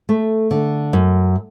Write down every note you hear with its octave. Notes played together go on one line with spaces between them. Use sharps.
A3
D3
F#2